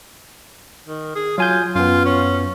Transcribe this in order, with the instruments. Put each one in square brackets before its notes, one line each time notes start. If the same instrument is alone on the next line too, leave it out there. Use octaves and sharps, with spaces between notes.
[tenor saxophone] D#3
G#4
[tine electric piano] F#3 G#5 G6 [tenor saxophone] F4
[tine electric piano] F#2 B3 [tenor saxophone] F4
[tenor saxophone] C#4